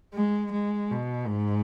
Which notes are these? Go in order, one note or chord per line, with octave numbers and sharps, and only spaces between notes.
G#3
G#3
B2
G#2